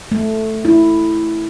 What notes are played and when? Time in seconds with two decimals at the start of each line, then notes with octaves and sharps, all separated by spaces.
0.12 A3
0.65 E4